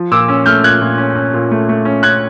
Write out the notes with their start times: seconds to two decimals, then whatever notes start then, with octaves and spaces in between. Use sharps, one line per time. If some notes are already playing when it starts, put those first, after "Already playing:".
Already playing: F3
0.12 A#2 D6 E6
0.28 C#4
0.46 A3 F6 G6
0.63 A#2 F#6 G#6
0.81 A#2
0.98 C#4
1.15 C#4
1.34 A#2
1.51 A3
1.69 A3
1.85 C#4
2.03 C#4 F#6 G#6